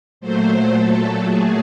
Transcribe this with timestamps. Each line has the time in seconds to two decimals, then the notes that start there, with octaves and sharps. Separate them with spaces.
0.21 A#2 F#3 A3 C5
0.73 A4
1.24 G#4